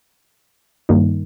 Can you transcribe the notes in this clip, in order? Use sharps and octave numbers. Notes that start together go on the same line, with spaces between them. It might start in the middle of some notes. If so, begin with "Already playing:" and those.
G2 D#3 G3 A#3 D#4